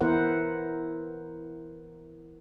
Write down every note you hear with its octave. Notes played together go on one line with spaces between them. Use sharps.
E3 B3 E4 A#4 C5 F#5